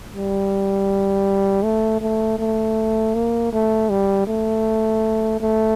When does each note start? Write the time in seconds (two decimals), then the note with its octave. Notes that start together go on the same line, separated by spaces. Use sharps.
0.13 G3
1.63 A3
2.01 A3
2.39 A3
3.15 A#3
3.53 A3
3.90 G3
4.28 A3
5.41 A3